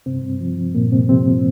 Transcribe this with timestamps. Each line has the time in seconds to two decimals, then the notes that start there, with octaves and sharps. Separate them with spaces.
0.06 G2 C3 C4
0.24 G2
0.41 F3
0.58 F3
0.75 G2 A#2 A#3
0.92 G2 C3 C4
1.09 C3 F3 C4
1.27 F3